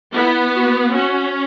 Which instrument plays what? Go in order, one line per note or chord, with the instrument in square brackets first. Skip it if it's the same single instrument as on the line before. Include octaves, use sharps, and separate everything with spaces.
[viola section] B3 [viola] E4
[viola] F#4
[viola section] C#4 [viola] F#4